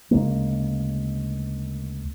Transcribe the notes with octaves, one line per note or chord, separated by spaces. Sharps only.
D2 C#3 G#3 A#3